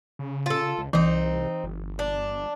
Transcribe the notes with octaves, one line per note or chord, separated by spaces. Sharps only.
C#3
F4 A4
C#2
C2 E3 C4 D#4
G1
D4